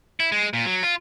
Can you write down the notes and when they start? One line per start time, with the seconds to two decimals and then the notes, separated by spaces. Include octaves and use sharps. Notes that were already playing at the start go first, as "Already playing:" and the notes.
0.20 E4
0.32 G#3
0.53 A#2
0.66 F#3
0.83 F4